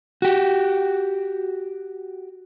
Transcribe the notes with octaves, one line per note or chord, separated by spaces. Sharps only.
F#4 G4